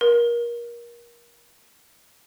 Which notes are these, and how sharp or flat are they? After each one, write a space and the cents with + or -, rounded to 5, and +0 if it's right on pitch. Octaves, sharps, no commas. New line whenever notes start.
A#4 +25